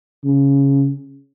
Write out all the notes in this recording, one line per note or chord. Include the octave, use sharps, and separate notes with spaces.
C#3